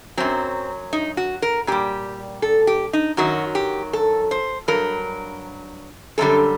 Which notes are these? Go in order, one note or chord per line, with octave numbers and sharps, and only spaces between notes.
F#2 F#3 C4
D#4
F#4
A#4
A#2 G3 G4
A4
G4
D#4
F#2 D#3 F#3 F#4
G4
A4
C5
G2 F#3 A#4
F#2 D3 G3 A4